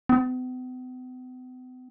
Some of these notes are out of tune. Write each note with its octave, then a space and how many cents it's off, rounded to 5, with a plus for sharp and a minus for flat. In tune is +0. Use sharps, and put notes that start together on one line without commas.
B3 +45